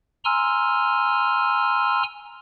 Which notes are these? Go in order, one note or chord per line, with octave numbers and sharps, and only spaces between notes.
G#5 A#5 C6 E6 F6